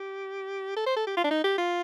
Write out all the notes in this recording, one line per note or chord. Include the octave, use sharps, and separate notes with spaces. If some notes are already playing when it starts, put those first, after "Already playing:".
Already playing: G4
A4
C5
A4
G4
F4
D4
D#4
G4
F4